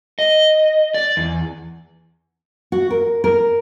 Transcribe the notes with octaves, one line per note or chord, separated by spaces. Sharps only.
D#5
D5
E2
F#4
A#4
A#4